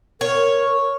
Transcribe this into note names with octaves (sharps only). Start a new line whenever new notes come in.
A#4 C#5